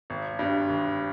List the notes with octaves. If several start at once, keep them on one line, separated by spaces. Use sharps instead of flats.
G#1
G2
G#1